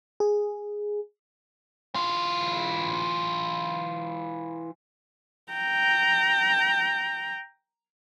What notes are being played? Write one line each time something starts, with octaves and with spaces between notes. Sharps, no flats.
G#4
E3 F4
G5 A#5